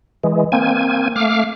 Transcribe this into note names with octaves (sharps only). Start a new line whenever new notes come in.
E3 G#3
A#3 C4 G#5
A3 F5 D6 F6